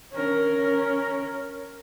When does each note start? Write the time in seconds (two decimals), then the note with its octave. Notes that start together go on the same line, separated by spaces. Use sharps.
0.13 C#4 A#4